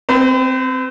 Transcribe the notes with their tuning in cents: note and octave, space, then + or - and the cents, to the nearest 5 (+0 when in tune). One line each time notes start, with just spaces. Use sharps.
C4 +0 B4 +45